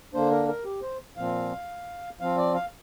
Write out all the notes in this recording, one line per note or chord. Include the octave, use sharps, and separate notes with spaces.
D3 A#3 D4 C5
A#4
A#4
G4
C5
A#2 F3 C4 F5
F3 C4 F5
D5
F5